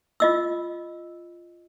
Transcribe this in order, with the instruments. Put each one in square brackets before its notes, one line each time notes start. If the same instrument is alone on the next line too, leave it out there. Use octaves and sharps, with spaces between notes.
[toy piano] F4 D#5 E6